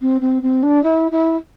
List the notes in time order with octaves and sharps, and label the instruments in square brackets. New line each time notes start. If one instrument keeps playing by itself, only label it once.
[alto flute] C4
C4
C4
D4
E4
E4